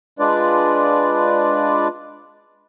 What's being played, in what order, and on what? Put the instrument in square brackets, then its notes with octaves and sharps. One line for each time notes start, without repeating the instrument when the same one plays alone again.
[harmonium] G#3 D4 F4 B4 D5